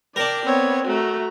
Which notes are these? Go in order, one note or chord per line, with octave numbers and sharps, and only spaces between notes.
D4 A#4 D5 G5
B3 C4 C#5
A3 F#4 A#5